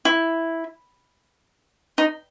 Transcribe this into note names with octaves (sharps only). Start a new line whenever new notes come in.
E4
D#4